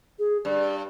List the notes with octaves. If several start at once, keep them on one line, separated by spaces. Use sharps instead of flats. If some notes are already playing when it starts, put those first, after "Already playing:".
G#4
G2 D5